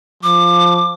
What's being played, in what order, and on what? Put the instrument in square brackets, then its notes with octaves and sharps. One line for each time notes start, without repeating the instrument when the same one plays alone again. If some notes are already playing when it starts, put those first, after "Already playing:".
[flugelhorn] F3 [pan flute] D6